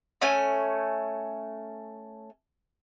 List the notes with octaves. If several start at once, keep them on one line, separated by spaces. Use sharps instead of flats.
A3 C#4 G#5